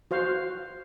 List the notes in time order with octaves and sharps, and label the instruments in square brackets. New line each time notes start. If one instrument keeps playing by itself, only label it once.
[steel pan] F#4 C5 F5